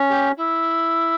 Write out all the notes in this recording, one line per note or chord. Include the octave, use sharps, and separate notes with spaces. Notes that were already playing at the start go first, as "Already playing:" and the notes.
Already playing: C#4
G4
E4